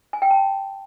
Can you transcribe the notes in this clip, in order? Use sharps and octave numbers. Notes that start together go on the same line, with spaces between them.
G#5
G5
A5